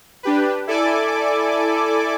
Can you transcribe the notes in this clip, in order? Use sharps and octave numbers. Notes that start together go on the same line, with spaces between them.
D4 G4 B4
E4 A4 D5 G#5 D6